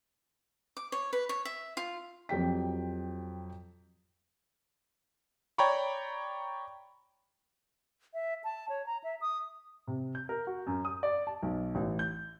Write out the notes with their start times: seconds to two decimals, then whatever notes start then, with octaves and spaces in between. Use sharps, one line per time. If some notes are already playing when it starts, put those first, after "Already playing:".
0.77 D6
0.92 C#5
1.13 B4
1.29 C#5
1.45 E5
1.77 F4
2.29 F2 F#3 G4 G5 B6
5.58 C#5 D5 G5 A#5 B5 C#6
8.14 E5
8.44 A5
8.69 C#5
8.86 A#5
9.04 E5
9.21 D#6
9.87 C3
10.15 G6
10.29 A#4
10.47 F#4
10.67 F#2
10.85 D#6
11.03 D5
11.27 A5
11.43 B1
11.75 A1
11.99 G6